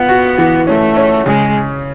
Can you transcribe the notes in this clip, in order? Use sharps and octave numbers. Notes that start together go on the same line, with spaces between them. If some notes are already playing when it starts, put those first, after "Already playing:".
Already playing: B3 F4
F#4
E3
A3 C#4
C#4
C#3 G#3